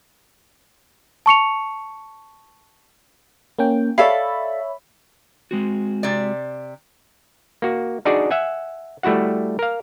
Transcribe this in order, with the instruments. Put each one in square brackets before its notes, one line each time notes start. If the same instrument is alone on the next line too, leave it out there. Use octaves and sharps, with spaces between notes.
[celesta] A5 C#6 C#7 F7
[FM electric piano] A#3 C#4 G5
[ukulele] A4 D5 F5 [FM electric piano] C#5 E5 B5
[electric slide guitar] G#3 C4 F#4
[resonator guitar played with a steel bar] C3 D5
[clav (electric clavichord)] A#3 F#4
D4 D#4 F#4 G#4 D5
E5 F#5 G#5
G3 A3 E4 F#4 F#5
A#4 F5